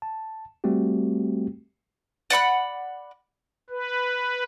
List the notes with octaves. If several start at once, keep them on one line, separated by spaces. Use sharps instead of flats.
A5
G3 A3 C4 F#4 G4
D5 F#5 B5 F#6
B4